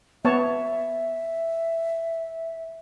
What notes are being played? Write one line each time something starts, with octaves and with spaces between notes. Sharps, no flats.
B3 C#5 E5 A5